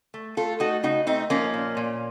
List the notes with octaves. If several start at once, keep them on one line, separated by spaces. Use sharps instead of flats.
A3
A3 F4 A4
A3 D#4 F#4
C#3 D#4 F#4
A3 C4 D#4
F3 A#3 C#4
A#2
A#2